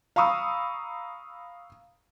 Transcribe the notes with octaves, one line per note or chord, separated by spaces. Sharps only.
F5 A#5 B5 C#6 D#6 E6